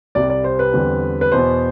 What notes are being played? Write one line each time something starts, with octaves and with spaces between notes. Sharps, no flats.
C2 C3 G3 D5
D5
C5
B4
E2 D3 G3 C4
B4
E2 B2 B3 C5